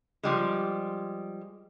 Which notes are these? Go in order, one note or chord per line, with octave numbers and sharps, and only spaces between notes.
F3 G3 G#3